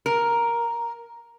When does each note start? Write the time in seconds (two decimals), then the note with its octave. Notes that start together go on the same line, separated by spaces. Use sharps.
0.06 A#4